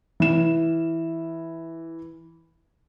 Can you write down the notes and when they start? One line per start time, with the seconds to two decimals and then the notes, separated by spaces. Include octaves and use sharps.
0.20 E3 E7